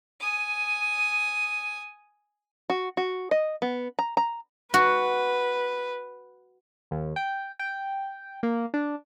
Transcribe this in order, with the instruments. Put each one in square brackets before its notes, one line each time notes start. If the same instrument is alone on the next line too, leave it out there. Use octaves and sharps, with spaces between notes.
[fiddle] G#5 D#6
[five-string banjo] F#4
F#4
D#5
B3
A#5
A#5
[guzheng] F#4 [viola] B4
[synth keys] D#2
G5
G5
A#3
D4